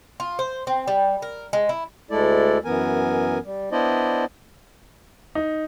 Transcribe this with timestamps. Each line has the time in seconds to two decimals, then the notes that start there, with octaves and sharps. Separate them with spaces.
0.20 F4
0.39 C5
0.67 C4
0.87 G3
1.22 A#4
1.53 G#3
1.69 E4
2.11 D2 G#3 A3 E4 A4 D5
2.65 F#2 E3 B3 A#4 G#5
3.45 G3
3.72 B3 D4 E4 C5 D5 D#5
5.35 D#4